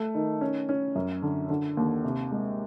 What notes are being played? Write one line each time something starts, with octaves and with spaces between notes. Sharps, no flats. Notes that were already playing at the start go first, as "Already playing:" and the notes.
Already playing: A3
D#3
C#4
C#4
F#2
D3
D3
D#2
C3
G#3